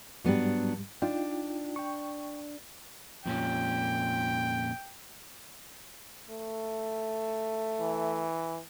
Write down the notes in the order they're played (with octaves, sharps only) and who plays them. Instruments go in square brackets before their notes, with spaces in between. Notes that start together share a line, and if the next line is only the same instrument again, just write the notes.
[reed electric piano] G#2 G3 [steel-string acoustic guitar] F#3 B3 D4
[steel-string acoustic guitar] D4 [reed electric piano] D#4 F4 G5
[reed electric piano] G5 C#6
[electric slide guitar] F2 A#2 C#4 [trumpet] G5
[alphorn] A3
[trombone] E3